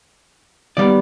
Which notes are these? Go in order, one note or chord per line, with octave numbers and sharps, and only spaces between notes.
D#3 G3 B3 D5